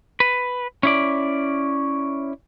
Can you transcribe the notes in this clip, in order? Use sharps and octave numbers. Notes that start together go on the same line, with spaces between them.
B4
C#4 E4 D5